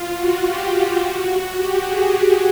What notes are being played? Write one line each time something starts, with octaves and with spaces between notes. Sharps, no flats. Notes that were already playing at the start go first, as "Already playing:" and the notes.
Already playing: F4
F#4
G4
F#4
G4
G#4